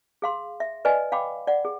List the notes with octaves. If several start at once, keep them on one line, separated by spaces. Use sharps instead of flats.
G#4 F5 C6
E5
B4 D5 D#5 G#5
F5 G5 B5 D6
D5 F#5
G#4